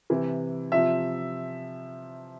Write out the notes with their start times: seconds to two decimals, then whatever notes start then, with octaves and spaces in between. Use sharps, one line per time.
0.10 C3 E3
0.72 C3 F3 E5